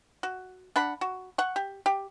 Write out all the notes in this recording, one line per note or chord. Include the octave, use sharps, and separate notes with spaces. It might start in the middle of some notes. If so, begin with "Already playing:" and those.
F#4
D4 F#5 B5
F#4
F#5 C#6
G4
G4